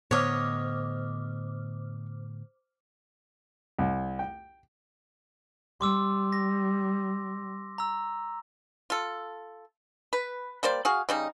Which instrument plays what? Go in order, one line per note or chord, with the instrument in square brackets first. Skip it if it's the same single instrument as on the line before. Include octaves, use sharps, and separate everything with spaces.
[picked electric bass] A2 D3 B3 [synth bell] C5 D6 F6 [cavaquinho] C#5 D#5
[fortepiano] C2
G5
[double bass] G3 [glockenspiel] C6 D6 E6
[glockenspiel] A#6
A#5 E6
[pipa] F4 A4
B4
G3 A#3 C5 D5
F#4 G#4 F5
C#3 G3 D#4